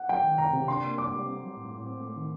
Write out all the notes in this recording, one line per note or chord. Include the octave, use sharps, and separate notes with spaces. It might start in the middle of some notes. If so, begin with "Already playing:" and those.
Already playing: F#5
F#3 G5
D#3
C3 A#5
C3
D4 C6
A#3
G3 D6
G3
C4
F#3
A2
A2
C4
A3
D#3